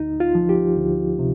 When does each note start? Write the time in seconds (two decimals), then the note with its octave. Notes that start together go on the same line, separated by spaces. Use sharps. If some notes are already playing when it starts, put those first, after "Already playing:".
Already playing: D2 D#4
0.20 F4
0.35 F3
0.49 G4
0.77 D2
1.19 C3